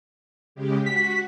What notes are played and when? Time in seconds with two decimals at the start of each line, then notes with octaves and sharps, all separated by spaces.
0.55 C#3 G#3 G4
0.86 F#4 B6